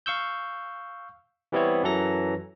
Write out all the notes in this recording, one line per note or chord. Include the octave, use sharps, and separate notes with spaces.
F5 C#6 E6 G6
E3 G3 B3 C4 E4 C#5
F#2 E3 F#3 A4 A#5 A#6